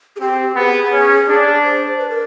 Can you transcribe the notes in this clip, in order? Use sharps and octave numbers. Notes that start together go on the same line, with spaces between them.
G#4
C4 G4
B3 G#4
C#4
D4
C5
B4
A#4